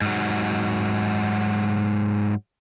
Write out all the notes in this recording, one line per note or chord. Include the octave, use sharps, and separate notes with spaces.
G#2 F#3